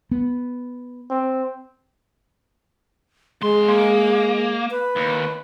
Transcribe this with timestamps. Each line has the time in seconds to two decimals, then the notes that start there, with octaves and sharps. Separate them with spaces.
0.11 B3
1.10 C4
3.42 F2 G#3 C6
3.68 A#3
4.71 B4
4.96 D#2